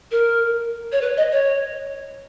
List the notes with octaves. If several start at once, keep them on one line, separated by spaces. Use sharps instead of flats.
A#4
C#5
B4
D#5
C#5